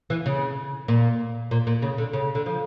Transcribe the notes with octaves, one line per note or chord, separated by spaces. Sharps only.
E3
C#3
A#2
A#2
A#2
C#3
D3
C#3
D3
F3